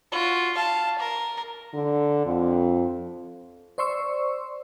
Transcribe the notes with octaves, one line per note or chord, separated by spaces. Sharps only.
F4 F#4
F5 A5
A#4
D3
F2
C5 D5 C6 C#6 E6